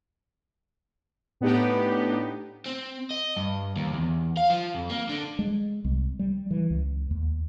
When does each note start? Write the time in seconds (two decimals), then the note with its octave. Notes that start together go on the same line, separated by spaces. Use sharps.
1.41 A2 B3 D4 D#4 G4
2.66 C4
3.11 D#5
3.36 G2
3.76 D#2
3.94 E2
4.37 F5
4.50 F3
4.75 F2
4.90 A#3
5.09 D3
5.39 G#3
5.84 C2
6.19 G3
6.51 E3
6.70 C#2
7.11 D#2